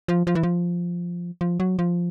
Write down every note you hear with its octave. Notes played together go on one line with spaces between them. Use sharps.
F3
F3
E3
F3
F3
F#3
F3